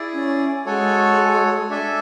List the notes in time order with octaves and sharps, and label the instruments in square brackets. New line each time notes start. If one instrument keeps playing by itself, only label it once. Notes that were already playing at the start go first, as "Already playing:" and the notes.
Already playing: [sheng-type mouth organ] E4 G#4 D5
[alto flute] C#4
[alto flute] G#3 [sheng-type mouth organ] F#4 A4 C#5 G#5
[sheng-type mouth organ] D4 A4 E5 G#5